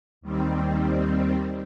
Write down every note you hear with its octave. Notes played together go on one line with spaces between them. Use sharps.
D#2 D#3 G3 C4